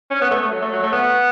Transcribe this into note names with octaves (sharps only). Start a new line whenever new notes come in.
C#4
B3
A3
A3
F#3
A3
F#3
A3
B3